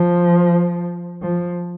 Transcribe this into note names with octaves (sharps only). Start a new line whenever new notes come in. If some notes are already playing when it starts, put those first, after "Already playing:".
Already playing: F3
F3